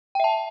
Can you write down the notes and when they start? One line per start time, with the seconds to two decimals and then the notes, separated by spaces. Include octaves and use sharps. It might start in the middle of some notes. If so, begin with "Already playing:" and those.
0.15 G5
0.20 E5
0.24 A5